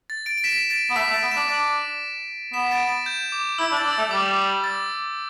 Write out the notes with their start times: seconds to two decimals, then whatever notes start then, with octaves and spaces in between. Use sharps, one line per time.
0.10 A6
0.26 A6 D7
0.38 D7
0.44 B6 E7
0.70 A6 D7
0.90 B3
0.96 A3 B6 E7
1.10 A3
1.14 A6 D7
1.23 B3
1.31 D4 B6 E7
1.48 D4 A6 D7
2.53 B3 B6 E7
2.71 A6 D7
2.89 A6
3.06 G6
3.32 D6
3.58 E4 E6
3.72 D4
3.77 A6
3.85 D4
3.93 A3 A6
4.11 G3 D6
4.64 A6